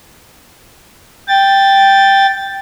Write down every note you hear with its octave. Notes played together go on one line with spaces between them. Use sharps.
G5 A6